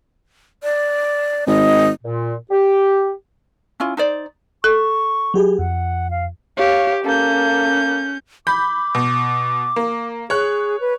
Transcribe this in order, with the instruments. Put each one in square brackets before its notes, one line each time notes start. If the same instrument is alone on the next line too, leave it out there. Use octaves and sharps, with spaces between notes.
[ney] D5
[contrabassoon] G#1 [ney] D#5
[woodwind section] A#2
G4
[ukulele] C#4 E4 F4
D#4 C5 D5
[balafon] A4 [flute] C#6
[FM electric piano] F#3 G4 G#4
[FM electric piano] F2 [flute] F#5
[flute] F5
[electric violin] G4 [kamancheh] C#5 F5
[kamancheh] A#3 A4 [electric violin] C#4 G6
[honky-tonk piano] B5 G6 [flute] D6
[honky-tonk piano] B2
A#3
[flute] G#4 [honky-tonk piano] C#5 F#6
[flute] B4